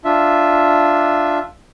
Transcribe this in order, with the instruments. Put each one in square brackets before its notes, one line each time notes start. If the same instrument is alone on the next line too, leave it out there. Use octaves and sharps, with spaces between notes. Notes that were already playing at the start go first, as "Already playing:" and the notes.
[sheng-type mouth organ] D4 F4 E5